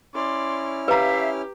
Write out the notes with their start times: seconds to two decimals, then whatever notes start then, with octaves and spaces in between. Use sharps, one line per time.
0.15 C#4 E4 D5 C6 F6
0.88 G4 B4 E5 F5 A#5